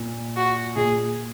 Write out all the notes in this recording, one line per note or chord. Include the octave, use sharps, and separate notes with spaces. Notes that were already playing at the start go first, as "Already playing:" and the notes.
Already playing: A#2
F#4
A#2 G#4